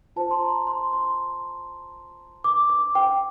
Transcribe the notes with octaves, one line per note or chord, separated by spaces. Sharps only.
F4 C5 A5
C6
A#5
C6
C6
D6
D6
G5